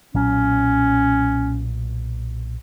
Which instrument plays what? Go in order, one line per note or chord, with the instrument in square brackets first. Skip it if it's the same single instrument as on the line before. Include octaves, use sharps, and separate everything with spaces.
[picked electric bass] B1 A#2 F#3 [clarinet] C#4